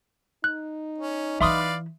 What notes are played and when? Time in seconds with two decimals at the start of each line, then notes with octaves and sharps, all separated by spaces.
0.44 D#4 F#6
0.98 C#4
1.41 E3 E4 B4 D5 E5 F5 C6 D#6